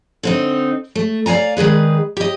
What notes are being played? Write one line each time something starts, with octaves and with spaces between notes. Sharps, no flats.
D3 C4 D#4
A3
D5 F5 G#5 A#5
D#3 G#3 G#4 B4
G4 D#5